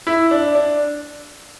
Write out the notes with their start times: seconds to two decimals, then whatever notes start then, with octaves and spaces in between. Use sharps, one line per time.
0.07 E4
0.31 D4
0.55 D4